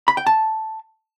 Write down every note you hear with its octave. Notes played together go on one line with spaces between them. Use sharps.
B5
G5
A5